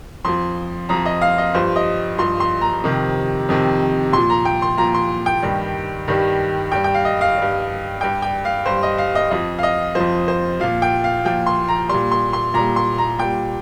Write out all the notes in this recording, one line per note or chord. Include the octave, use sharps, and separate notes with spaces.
F2 F3 C6
F2 F3 A#5
D#5
F5
D#5
G2 F3 C5
D#5
G2 F3 C6
C6
A#5
F2 C3 D#3
F2 C3 D#3
A#2 F3 C6
A#5
G5
C6
A#2 F3 A#5
C6
G5
G2 D#3 G3
G2 D#3 G3
G2 G3 G5
G5
F5
D#5
F5
G2 G3
G2 G3 G5
G5
F5
G2 G3 C5
D#5
F5
D#5
F2 F3 D#5
F5
D#5
F2 F3 C5
C5
A#2 F3 F5
G5
F5
A#2 F3 G5
C6
A#5
G3 C6
A#2
C6
C6
A#2 G3 A#5
C6
A#5
A#2 G3 G5